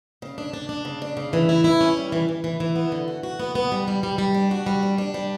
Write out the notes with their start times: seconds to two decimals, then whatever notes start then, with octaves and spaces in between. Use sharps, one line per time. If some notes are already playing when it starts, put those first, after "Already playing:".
0.22 C#3
0.38 D4
0.53 D4
0.69 D4
0.85 C#3
1.02 D4
1.17 C#3
1.33 E3
1.49 E4
1.64 E4
1.81 C#4
1.97 G3
2.12 E3
2.29 E3
2.44 E3
2.60 E3
2.76 B3
2.92 D3
3.08 F#4
3.23 F#4
3.40 B3
3.55 B3
3.72 G3
3.88 G3
4.03 G3
4.18 G3
4.34 D4
4.51 F#4
4.66 G3
4.83 D4
4.98 D4
5.14 G3